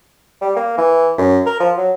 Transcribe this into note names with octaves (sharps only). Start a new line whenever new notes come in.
G3
A#3
E3
F#2
A#4
F3
F#3